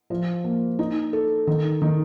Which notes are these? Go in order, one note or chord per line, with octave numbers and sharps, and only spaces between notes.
F3
A#3
D#4
A4
D#3
D#3